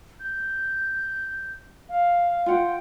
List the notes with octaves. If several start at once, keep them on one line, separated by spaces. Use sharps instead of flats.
G6
F5
F4 F#5 G5